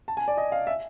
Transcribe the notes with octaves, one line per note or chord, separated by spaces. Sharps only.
A5
G#5
D5
D#5
F5
E5